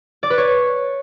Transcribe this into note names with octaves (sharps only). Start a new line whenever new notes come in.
D5
B4
C#5